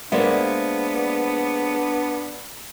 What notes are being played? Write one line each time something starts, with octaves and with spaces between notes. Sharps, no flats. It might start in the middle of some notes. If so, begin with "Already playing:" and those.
G#3 A#3 B3 D4 C5 D5 E5